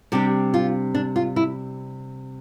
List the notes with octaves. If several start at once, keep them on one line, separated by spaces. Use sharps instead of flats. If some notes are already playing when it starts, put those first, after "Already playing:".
C3 G3 D4 G4
F4
D4
F4
E4